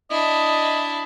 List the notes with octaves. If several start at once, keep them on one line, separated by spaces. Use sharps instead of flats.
D4 E4 D#5